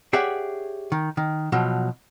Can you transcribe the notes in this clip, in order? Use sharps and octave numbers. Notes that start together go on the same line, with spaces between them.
G4 G#4 C#5 D5 E5 F#5
D#3
D#3
B2 F3 F#3